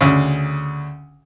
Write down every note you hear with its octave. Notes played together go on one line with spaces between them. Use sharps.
D2 C#3